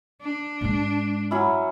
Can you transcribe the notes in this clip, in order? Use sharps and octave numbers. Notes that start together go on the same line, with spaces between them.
D4
G#2 G#3
F#3 C#4 E4